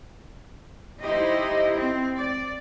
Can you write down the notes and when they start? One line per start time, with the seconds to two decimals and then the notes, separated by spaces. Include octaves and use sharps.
1.03 D#4 E4 G4 C5 D#5
1.78 C4
2.15 D5